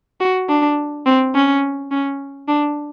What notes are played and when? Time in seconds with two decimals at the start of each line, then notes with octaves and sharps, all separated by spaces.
0.21 F#4
0.49 D4
1.06 C4
1.34 C#4
1.91 C#4
2.48 D4